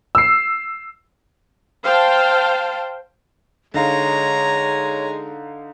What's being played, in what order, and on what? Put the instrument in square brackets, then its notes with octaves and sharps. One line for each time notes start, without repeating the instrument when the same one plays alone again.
[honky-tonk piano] E6 C7
[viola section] C5 F5 G5 A5
[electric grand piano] D3 D#4 F5 [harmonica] G#3 [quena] C#5 [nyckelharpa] A#5